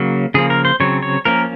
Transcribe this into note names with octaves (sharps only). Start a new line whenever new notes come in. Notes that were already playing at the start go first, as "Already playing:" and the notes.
Already playing: C#3 F#3 A#3
C#3 F3 A#3 G#4
A#4
C5
C#3 F#3 C4 C#5
C#5
F3 A#3 C#4 A#4